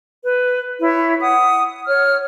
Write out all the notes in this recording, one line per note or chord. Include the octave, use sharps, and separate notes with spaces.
B4
E4 C#5
F#5 D#6
C#5 F6